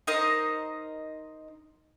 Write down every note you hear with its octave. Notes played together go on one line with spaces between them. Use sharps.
D#4 A#4 C5 D#5